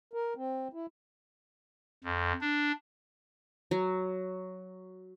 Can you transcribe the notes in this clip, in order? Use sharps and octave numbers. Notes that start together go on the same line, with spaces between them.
A#4
C4
E4
F2
D4
F#3